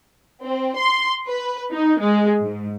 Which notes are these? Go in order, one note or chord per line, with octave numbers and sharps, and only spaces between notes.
C4
C6
B4
D#4
G#3
G#2